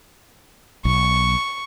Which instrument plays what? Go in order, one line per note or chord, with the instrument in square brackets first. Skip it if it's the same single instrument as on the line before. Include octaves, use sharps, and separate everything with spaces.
[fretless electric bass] B1 [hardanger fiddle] C#6